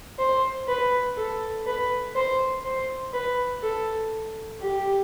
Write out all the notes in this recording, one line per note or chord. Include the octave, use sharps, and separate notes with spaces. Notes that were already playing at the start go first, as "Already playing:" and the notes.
C5
B4
A4
B4
C5
C5
B4
A4
G4